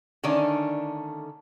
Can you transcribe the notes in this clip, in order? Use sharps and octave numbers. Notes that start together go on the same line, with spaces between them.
D3 D#3 A3 C#4 D4